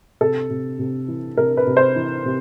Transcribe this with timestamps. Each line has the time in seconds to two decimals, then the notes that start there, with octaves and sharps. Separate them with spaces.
0.21 C3 A4
0.50 C3
0.79 C3
1.08 E3
1.37 C3 A#4
1.57 B4
1.67 C3
1.77 C5
1.96 E3
2.25 C3